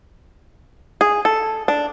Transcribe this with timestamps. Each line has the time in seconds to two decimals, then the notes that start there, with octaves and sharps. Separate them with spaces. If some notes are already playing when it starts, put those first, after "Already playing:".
1.01 G#4
1.25 A4
1.68 D4